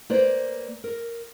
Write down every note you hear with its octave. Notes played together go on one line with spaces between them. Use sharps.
A#3 B4 C5 D5
A#4